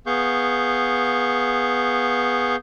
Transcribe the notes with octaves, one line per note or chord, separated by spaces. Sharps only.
B3 G#4 F5 C#6 G6